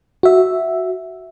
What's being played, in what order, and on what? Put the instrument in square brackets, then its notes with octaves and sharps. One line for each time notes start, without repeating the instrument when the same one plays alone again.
[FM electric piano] F#4 E5